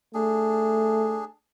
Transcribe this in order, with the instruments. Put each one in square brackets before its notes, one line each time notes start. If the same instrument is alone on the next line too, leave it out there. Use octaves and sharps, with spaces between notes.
[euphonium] A3 [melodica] D4 G#4